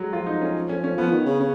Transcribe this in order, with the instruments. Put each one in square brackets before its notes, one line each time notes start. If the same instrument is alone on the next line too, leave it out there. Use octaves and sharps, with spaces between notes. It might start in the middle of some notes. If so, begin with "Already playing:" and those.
Already playing: [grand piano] F#3 G#3
[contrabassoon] F3 [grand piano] F4
[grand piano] D#4
C#4
C#4
C#4
[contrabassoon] F3 [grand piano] B3
[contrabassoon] D#3
C#3
C#3